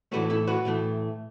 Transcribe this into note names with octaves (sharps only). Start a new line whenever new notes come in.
A2 E3 A3 F#4 B4
E4 A4
F#4 B4
A2 E3 A3